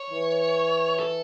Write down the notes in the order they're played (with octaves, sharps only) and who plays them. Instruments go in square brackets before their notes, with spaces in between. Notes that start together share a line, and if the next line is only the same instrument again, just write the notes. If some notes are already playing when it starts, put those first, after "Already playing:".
Already playing: [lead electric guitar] C#5
[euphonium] E3
[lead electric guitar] A4